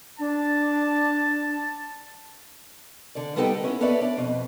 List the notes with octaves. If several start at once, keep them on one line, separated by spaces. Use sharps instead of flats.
D4 A5
D3 D5
G3 B3 D#4 A4 G5
B3 C#4 E4
B3 A4 B4 C#5 D5 E5
D4
F2 B2